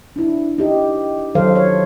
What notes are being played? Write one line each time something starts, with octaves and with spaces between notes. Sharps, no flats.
D4 E4
D#4 G4 D#5
D#3 E3 F#3 A4 C5 F5
C#5